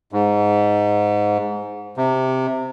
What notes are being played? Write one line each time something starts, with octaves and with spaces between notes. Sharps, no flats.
G#2
C3